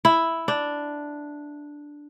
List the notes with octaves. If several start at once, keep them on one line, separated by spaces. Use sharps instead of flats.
E4
D4